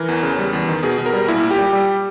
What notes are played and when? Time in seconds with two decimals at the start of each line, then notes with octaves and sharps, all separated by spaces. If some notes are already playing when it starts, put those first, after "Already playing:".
Already playing: E3 A#4
0.08 E2
0.23 C#3
0.38 G3
0.53 E2
0.68 D#3
0.83 B2 G#4
0.98 B2
1.06 A#4
1.13 G3
1.28 A#2 E4
1.43 A#2
1.51 G4
1.58 G3
1.73 G3 G4